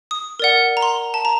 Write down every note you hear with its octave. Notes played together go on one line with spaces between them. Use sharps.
D#6
A#4 D5 F#5
A#5
C6
A5
A#5